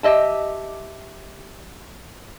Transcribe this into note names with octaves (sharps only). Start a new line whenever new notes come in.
G4 D#5 E5 A5